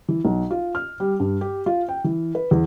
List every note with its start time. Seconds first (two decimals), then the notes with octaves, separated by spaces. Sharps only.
0.08 E3
0.25 B1
0.51 F4
0.75 F6
1.00 G3
1.20 G2
1.41 G4
1.66 F4
1.88 G5
2.04 E3
2.35 B4
2.51 E2